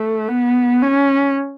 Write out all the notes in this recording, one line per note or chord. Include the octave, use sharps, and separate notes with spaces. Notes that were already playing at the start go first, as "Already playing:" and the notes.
Already playing: A3
B3
C#4